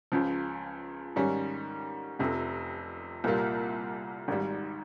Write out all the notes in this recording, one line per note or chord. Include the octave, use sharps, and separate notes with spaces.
C#2 C#3 F3
G#2 D#3 G3 C#4
F1 F2 C3
C2 A#2 G3 A#3 F4
G#1 G#2 G3